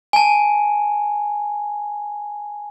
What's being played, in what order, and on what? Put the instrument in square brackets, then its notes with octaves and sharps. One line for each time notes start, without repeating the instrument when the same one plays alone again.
[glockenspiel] G#5 A5